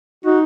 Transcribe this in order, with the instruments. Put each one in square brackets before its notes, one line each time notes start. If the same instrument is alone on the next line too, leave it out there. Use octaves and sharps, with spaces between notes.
[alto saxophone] D#4 [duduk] F#4